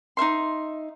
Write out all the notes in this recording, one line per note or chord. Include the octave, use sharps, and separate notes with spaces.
D#4 A#4 E5 C6